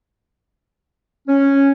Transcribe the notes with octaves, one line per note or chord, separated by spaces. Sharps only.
C#4